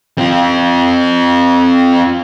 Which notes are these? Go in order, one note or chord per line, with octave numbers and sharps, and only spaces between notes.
C4 F4